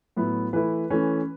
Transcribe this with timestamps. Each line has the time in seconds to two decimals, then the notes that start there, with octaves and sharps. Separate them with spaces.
0.17 A2 F#3 B3 E4
0.53 E3 A3 E4 B4
0.90 E3 A3 C#4